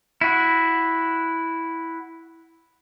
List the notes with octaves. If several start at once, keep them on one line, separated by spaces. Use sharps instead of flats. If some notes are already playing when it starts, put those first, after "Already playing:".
E4 F#4